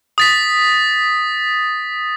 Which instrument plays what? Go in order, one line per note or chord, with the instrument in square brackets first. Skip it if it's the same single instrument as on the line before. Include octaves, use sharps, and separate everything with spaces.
[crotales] D#6 A6 B6